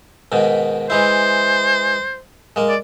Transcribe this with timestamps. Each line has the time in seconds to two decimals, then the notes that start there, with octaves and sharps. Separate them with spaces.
0.32 G#2 B2 D#3
0.90 E3 G#3 E4 C5
2.56 G#3 A#3
2.69 D5